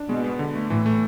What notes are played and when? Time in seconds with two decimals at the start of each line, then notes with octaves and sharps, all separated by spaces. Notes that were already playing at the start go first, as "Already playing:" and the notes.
Already playing: D4
0.09 B2 G#3
0.24 B3
0.39 D3
0.55 A3
0.70 A2 E3
0.86 A3